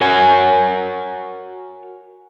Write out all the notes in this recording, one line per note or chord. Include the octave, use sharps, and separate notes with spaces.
F#4 A#4 C#5 F#5 G#5